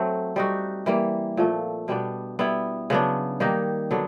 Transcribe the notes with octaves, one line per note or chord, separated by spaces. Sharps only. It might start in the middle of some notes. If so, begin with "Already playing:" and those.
Already playing: F#3 A3 C4
G3 C4 D#4 F#4
E3 G3 A#3
A#2 F3 A3
B2 G3 B3 D4
G3 B3 E4
C#3 F#3 B3 D4
D#3 G3 A#3 D#4
D3 F#3 B3 D4